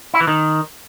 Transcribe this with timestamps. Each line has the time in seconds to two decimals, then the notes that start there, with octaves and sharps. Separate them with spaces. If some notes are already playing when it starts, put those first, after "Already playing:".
0.14 E4
0.21 E3
0.27 D#3